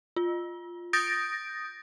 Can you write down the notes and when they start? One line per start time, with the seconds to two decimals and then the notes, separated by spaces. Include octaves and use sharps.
0.16 F4
0.93 D#6 G6 A6 A#6 D7